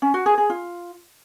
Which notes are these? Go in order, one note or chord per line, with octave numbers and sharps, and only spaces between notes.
C#4
F#4
G#4
G#4
F4